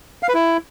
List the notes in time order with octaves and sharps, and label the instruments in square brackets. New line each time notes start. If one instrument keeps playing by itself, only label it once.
[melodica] F5
B4
E4